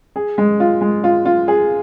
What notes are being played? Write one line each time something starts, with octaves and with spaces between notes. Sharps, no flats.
G#4
G#3
F4
G#3
F4
F4
G#4